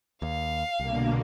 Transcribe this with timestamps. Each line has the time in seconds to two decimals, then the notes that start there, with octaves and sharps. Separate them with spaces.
0.22 D#2 F5
0.80 C2 B2 D3 A#3